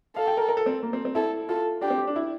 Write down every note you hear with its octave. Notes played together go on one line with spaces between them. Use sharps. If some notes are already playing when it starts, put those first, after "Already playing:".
A4 F5
G5
A#4
A#4
A4
C4
A#3
C4
C4
E4 A4
F4 A4
D4 G4
C4
G4
D4
E4